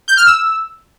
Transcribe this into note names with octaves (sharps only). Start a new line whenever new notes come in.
G6
F6
E6